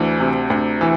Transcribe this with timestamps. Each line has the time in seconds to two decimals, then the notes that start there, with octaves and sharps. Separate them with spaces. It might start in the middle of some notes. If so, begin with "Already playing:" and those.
Already playing: D2 E3
0.20 C3
0.50 D2
0.81 E3